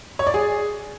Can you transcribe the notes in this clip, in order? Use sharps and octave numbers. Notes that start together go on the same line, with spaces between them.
C#5
D5
G#4